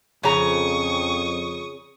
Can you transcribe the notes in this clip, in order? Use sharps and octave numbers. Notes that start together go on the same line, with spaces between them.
F2 C#3 A#5 C#6 D#6